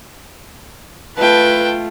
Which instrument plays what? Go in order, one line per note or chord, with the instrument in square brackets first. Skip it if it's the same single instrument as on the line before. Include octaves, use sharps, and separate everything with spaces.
[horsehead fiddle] A3 F4 [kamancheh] B4 [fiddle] G5 A5